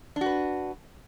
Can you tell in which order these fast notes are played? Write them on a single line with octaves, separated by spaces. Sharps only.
D4 F#4 B4